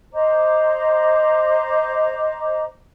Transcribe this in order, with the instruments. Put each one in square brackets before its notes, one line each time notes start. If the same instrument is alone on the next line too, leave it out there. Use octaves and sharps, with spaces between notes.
[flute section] C5 D#5 A#5 D6